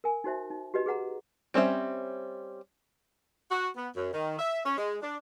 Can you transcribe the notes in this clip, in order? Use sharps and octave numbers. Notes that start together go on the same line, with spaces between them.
A#4 G#5
D#4 F#4 C5 E5
D#4
F#4 G4 B4 D#5
G#4 B4 F#5 A#5
G3 C4 C#4 C5 E5
F#4
B3
F#2
D#3
E5
C#4
G#3
D4